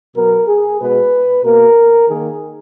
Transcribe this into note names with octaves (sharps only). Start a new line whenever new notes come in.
B2 F#3 B3 A#4
G#4
B2 G#3 B3 B4
B2 A#3 A#4
D#3 A#3 G#4